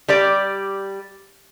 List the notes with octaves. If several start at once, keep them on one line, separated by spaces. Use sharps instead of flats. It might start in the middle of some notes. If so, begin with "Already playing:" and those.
G3 G4 D5